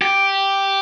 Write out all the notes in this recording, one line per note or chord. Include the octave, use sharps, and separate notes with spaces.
G4